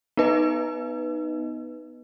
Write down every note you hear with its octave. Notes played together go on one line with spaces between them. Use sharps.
B3 D#4 B4 D#5